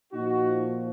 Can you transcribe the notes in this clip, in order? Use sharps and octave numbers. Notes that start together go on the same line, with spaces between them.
A#2 F3 D#4 F#4